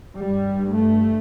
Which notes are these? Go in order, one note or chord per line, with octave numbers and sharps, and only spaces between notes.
G2 G3
A3